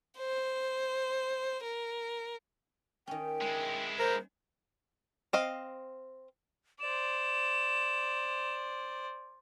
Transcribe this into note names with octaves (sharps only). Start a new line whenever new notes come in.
C5
A#4
D#3 C#4 G5
G#3 E4
A#4 C5
C4 D#5 F5
C5 D5 E7